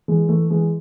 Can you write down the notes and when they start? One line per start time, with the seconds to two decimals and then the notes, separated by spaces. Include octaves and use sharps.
0.08 E3 G#3
0.28 E3 A3
0.50 E3 G#3